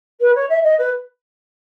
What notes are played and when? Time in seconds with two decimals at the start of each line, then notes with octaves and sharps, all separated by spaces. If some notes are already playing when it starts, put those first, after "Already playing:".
0.20 B4
0.35 C#5
0.49 E5
0.63 D#5
0.78 B4